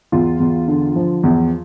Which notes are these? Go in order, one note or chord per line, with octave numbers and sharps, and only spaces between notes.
E2 F4
E2
D3
F3
E2